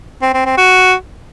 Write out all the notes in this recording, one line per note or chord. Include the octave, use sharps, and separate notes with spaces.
C4
C4
C4
F#4